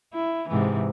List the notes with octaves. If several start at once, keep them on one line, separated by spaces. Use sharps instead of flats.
E4
G#2 C3 E3